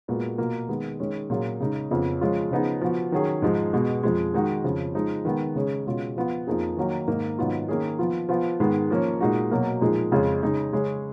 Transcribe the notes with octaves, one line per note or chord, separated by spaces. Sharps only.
A#2 G#3 B3 F#4
B2 A#3 F4
D#3 G#3 B3
D#3 G#3 C#4
A#2 F#3 C#4 F4 G#4
C#3 G#3 D#4
F2 C#3 F3 B3
F3 G#3 C#4 F4
C#3 F3 B3 D#4 G#4
F3 B3 F#4
D#3 F#3 C#4 G#4
G#2 F3 G#3 D#4
B2 G#3 B3
F2 F3 G#3
D#3 G#3 D#4 F#4
F2 C#3 F3
F3 G#3 D#4
D#3 G#3 B3
C#3 G#3 C#4 G#4
B2 G#3 C#4 F4
F3 B3 F4
F2 F3 A#3 D#4 G#4
D#3 F#3 A#3 D#4
G#2 D#3 A#3 D#4
G#2 D#3 F#3 B3 F4
D#3 A#3 C#4 G#4
F3 B3 F4
F3 B3 F4
G#2 D#3 G#3 B3
F3 A#3 C#4
A#2 G#3 D#4 F#4
B2 F#3 A#3
A#2 F3 G#3 D#4 G#4
F2 C#3 G#3 C#4 F4
C#3 G#3 D#4 G#4
C#3 G#3 C#4 G#4